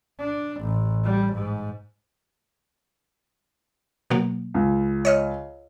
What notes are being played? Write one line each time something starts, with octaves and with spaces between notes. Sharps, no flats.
D4
A1
G3
G#2
B2 F#3 A#3
C#2
C#5 D#5 F6